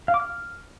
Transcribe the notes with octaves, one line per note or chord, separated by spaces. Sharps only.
F5
D6
F6